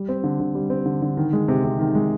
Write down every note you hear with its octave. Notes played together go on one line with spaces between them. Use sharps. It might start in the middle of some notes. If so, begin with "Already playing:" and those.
Already playing: G3
C4
D3
D3
G3
C4
D3
D3
D#3
G#3
C3
C3
D#3
G#3